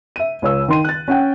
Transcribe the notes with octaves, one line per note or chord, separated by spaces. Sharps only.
E5 D#7
C#2 C#5 E6
D#3 C6 D#7
F#6 A6
C#4 F#5 G5